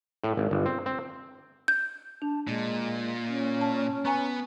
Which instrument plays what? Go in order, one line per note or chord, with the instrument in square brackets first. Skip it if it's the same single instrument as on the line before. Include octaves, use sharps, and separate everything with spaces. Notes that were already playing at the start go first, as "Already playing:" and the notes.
[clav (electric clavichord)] A2
G#1
G1
C4
C4
[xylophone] G6
[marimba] D4 [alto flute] A5
[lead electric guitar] A#2 [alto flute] G#3
[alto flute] C#4
[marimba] A5
[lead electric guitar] B3 [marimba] G#5 A#5 C#6